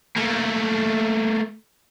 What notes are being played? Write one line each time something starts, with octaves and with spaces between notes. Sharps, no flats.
A3 A#3